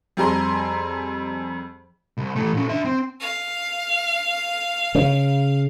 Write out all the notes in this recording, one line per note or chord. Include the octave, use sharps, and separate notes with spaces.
F2 G3 G#4 A#5 C6
C2
E3 A3
A#2 C#4
D4 E5
C4
F5
C#3